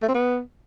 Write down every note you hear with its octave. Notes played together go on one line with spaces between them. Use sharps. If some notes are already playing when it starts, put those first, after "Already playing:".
A3
C4
B3